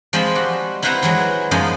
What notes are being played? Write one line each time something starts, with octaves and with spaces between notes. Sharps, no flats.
F3 G#3 C4 C5 B5
G3 F#4
C4 E4 B4 C5 F#5 A#5
E3 F#3 G#3
F#2 F3 G#3 B3 D#4